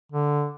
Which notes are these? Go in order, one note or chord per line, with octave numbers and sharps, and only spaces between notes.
D3